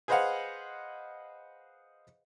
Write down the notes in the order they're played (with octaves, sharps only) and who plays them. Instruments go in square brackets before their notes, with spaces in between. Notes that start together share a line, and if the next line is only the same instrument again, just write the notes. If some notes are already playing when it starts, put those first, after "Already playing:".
[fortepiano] G#4 B4 C5 D#5 F5 F#5